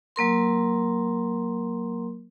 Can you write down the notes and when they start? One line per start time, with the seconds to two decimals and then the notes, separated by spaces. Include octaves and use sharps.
0.16 F#3 A#3 A#4 C6